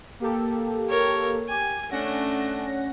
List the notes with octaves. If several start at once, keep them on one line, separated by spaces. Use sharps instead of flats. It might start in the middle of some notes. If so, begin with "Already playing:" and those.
A#3 G4 A4
A#4 C#5
G4 G#5
A3 C#4 D4 F#5 A#6